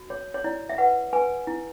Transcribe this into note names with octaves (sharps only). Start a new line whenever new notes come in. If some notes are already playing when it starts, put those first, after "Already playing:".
Already playing: F#4
C#5
C#5
E4 D5
E5
B4 F#5
B4 G#5
E4